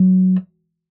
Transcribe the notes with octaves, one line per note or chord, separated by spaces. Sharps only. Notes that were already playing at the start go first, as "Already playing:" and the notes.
Already playing: F#3